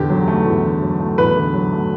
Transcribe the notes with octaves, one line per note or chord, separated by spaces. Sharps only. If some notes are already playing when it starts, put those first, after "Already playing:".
Already playing: E2 D3 G4
F#3
A3
E2
D3
F#3
A3
E2 B4
D3
F#3
A3